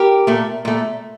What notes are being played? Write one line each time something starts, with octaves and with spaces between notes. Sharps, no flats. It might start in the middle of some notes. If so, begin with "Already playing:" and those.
Already playing: G4 A#4
A#2 A3
A#2 A3